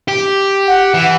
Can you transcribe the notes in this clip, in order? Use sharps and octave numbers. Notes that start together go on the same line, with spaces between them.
G4
F#5
E3